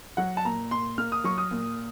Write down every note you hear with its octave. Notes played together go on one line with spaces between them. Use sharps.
F#3 F#5
A5
A#2 A#5
A#2 C6
A#3 F6
D#6
F#3 C#6
D#6
A#2